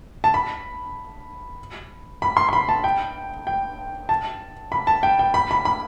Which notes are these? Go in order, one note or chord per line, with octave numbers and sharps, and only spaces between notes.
A5
B5
B5
C6
C6
B5
A5
G5
G5
A5
B5
A5
G5
G5
B5
B5
B5